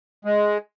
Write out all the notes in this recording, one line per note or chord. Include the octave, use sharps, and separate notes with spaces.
G#3